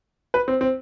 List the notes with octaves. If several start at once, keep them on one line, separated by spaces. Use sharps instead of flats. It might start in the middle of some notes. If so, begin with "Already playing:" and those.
B4
C4
C4